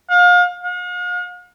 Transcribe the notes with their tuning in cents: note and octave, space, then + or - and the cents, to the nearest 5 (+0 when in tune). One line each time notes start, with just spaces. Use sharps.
F5 +35
F5 +45